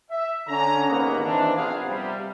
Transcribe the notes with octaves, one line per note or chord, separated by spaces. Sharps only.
E5
D3 C#4 A#5
D#2 G#2 C3 A#3 B3
D#3 E3 C4 D4
A#1 C3 B3 C4 G#4 F5
C3 G3